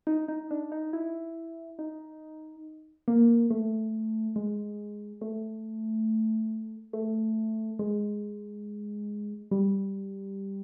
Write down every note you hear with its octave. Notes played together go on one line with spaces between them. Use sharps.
D#4
D#4
D4
D#4
E4
D#4
A#3
A3
G#3
A3
A3
G#3
G3